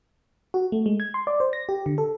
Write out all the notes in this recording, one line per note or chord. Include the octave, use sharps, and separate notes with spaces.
F#4
A3
G#3
G#6
C6
D5
C5
A#6
G4
D3
A4